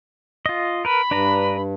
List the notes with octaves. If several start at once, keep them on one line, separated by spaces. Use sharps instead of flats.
F4 D#5
A#4 B4 B5
G2 D4 B4 A#5